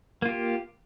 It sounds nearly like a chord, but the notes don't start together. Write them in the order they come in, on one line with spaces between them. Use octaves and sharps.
A#3 F4 G4